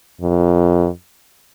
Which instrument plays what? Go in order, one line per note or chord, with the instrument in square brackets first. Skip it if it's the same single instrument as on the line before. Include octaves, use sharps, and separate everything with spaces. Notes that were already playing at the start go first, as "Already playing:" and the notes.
[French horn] F2